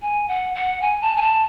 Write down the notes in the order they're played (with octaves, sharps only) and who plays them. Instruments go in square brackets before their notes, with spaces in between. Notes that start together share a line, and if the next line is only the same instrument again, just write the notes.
[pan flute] G#5
F#5
F#5
G#5
A5
G#5
A5